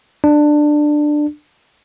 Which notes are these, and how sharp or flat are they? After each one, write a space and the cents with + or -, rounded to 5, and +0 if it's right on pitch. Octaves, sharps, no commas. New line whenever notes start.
D4 +15